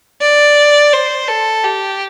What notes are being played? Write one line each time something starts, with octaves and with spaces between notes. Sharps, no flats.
D5
C5
A4
G4